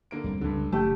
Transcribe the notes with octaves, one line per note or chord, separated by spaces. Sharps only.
D3 A#3 D7
E2 G3 C4
C#2 G2 D3
F#1 C3 A3 G4 A5